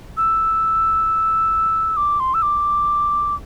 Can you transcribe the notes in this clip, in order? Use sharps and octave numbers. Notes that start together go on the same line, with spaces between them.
E6
D6
C6
E6
D6